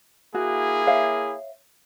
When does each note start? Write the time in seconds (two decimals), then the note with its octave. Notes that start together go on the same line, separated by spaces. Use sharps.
0.34 A#3 E4 F#4 G#4
0.87 C#5 E5 F5